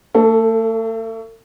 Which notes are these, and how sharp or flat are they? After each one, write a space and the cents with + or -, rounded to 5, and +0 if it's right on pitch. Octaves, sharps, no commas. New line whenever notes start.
A3 +40 A4 +0